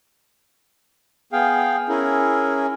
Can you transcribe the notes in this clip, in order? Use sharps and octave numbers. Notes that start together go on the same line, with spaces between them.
B3 G#4 F5 G5
C#4 E4 G#4 A#4